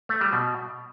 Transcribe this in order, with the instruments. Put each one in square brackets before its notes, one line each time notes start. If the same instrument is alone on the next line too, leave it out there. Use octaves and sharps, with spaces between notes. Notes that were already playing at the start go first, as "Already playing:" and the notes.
[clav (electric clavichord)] A3
G3
B2